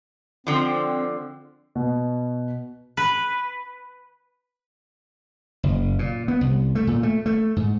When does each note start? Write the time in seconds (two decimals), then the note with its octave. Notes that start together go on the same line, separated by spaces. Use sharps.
0.47 D3 F3 C4
1.75 B2
2.97 B4
5.63 F#1
5.99 A#2
6.28 B3
6.41 C2
6.75 A3
6.87 A#2
7.03 A3
7.26 A3
7.56 G#2